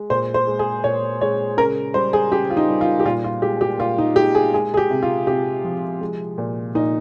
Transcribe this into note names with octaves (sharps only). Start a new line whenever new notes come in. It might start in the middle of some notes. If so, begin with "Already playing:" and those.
Already playing: G#3
A#2 C5
C5
G#3
G#4
A#2 C#5
G#3 C#5
C#3 A#4
G3 C5
G#4
C#3 G4
F4
D#4
G3
F4
G4
A#2 F4
F4
G#3 G4
G4
A#2 F4
D#4
G#3 G4
G#4
G#3 G#4
G#4
G4
C3
F4
C3 G4
F3
G#3
A#2
A#2 D#4